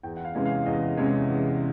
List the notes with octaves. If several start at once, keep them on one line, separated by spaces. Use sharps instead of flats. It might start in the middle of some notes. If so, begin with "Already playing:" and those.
E2 G5
F#5
F5
C3 E3 G#3 C#4
F5
E2 D#5
C3 E3 G#3 C#4
E2